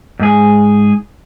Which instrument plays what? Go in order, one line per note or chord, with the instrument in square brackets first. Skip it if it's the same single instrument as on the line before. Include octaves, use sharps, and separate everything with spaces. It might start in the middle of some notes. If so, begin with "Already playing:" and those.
[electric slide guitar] G#2 G#4